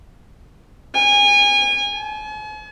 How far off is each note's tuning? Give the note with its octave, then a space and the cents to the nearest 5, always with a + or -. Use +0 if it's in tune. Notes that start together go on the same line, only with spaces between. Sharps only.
G#5 -30
G#5 +45